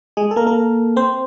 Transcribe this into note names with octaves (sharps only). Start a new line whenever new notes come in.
G#3 G#4
A4
A#3 A#4
A#3 A#4
C4 C5